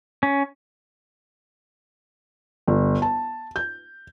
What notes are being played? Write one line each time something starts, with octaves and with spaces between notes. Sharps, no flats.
C#4
G1
A5
G6